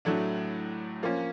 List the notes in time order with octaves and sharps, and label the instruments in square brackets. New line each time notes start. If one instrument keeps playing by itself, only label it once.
[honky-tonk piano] A2 F#3 A3 D4
F3 A#3 C#4